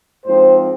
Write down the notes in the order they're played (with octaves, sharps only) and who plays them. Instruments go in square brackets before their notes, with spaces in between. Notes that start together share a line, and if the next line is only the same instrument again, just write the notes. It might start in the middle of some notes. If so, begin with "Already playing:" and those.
[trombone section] G#2 F3 C4 C5